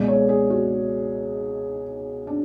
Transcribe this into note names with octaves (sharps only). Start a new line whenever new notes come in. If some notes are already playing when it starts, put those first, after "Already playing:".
Already playing: C#2 B2 G#3 D5
C#5
G#4
F#4
D4